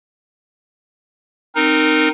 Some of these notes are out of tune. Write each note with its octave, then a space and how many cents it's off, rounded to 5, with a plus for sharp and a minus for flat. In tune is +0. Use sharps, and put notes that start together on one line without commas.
C4 +0 D#4 -15 A#4 +0